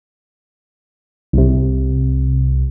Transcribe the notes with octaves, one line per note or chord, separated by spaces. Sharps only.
C2 C3